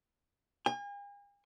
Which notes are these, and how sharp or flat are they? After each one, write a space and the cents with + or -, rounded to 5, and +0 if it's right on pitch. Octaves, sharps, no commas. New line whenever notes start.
G#5 -45